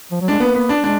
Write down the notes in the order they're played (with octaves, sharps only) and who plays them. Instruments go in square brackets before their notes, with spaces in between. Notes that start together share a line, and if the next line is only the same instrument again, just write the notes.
[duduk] F3
F#3
[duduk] G#3 [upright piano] D4
[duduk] A#3 [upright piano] B3
[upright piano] B3
D4
[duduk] G#3 [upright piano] D4